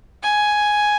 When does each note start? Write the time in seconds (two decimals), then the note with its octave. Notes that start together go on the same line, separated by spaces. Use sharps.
0.22 G#5